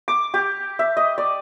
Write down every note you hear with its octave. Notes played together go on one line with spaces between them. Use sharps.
D6
G4
E5
D#5
D5